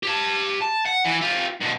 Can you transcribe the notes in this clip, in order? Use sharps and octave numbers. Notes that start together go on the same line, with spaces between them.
G4 A5
A5
F#5
E3
F4 G4
G2 B2